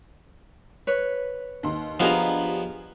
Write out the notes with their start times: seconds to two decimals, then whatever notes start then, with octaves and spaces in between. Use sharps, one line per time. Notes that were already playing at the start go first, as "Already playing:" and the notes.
0.87 B4 C#5
1.63 D#2 C6
2.00 F3 B3 D4 F4 G4 G#4 D#5 A#5